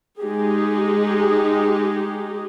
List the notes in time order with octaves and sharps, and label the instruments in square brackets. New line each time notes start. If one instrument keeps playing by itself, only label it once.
[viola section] G#3 D#4 G4 G#4